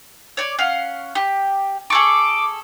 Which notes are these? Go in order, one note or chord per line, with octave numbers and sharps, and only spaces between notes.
C#5 D5
C#4 F5 F#5
G4
G#4 A4 C#6 D6